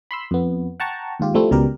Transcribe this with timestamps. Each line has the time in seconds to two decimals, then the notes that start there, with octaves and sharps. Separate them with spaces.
0.11 B5 C6 E6
0.31 F2 B3
0.80 F#5 G5 A5 A#5 C#6
1.20 D#2 G#2 F4 G4
1.34 F3 G3 A3 C4 E4
1.51 C#2 B2 G3 G4 A#4